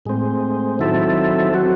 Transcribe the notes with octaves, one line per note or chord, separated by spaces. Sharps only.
A2 G#3 C4
D#3 F#3 C4 E4 A4
F#3 C4 F#4